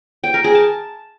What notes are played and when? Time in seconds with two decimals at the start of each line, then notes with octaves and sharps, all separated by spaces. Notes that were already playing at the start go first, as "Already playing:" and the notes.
0.24 G5
0.34 A#4
0.44 G#4
0.55 A5